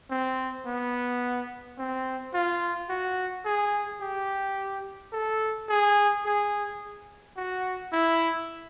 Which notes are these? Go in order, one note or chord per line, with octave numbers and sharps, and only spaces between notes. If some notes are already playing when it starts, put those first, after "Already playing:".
C4
B3
C4
F4
F#4
G#4
G4
A4
G#4
G#4
F#4
E4